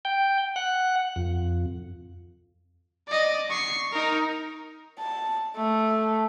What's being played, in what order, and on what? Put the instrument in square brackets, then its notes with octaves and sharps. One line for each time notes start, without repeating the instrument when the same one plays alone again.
[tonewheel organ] G5
F#5
F2
[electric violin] D5 D#5
C#6 C7
D#4 A#4
[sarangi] A5
A3